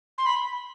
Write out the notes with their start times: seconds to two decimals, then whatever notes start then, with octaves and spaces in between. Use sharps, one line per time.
0.18 C6
0.26 B5